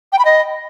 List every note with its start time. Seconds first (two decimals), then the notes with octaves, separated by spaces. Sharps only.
0.12 G5
0.19 B5
0.25 D#5